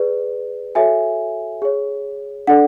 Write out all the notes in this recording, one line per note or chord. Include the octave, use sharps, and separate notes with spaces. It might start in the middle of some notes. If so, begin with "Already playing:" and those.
Already playing: G#4 B4 D5
F#4 A4 C#5 E5 G#5
G#4 C#5
D4 A4 D5 F#5